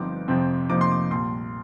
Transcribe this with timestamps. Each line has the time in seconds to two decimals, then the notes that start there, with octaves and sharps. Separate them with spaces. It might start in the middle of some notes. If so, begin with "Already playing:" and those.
Already playing: G1 G2 F3 C4 D#4 D6
0.28 F2 C3 F3 C4
0.69 F2 C3 F3 A#3 D#4 D6
0.81 C6
0.91 D6
1.11 A#1 A#2 G3 C6